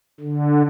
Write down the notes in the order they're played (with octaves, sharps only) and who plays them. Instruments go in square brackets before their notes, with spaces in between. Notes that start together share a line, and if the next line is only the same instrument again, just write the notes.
[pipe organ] D3